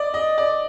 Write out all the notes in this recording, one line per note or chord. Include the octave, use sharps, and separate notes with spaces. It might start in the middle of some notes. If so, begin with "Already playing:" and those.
Already playing: D5 D#5
D#5
D5